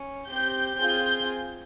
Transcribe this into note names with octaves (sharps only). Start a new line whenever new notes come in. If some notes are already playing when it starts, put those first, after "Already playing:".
Already playing: C#4
C4 G4 G6
C4 F4 G#4 G6